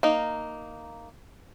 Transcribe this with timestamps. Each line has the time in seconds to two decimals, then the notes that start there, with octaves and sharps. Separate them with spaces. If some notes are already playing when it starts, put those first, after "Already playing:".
0.03 A#3 D#4